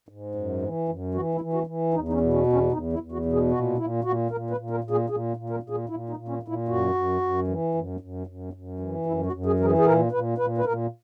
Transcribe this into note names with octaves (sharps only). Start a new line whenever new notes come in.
G#2
F#2
E3
F#2
E3 F#4
E4
E3
F#4
E3
E2 D#4
D#4
C#4
B2
C#4
E2
C#4
E2 D#4
E4
E2
F#4
B2
G#4
A#2 F#4
A#2 E4
A#2 F#4
A#2 A#4
B4
A#2
A#4
A#2
G#4
A#2 G#4
A#2
A#4
A#2
G#4
A#2 E4
D#4
A#2
C#4
A#2
E4
F#2 F#4
F#2
F#2
E3
F#2
F#2
F#2
F#2
E3
F#2 E4
F#4
F#2
G#4
E3 A#4
G#4
G#4
A#2 A#4
A#2 B4
A#2 B4
B4
A#2 A#4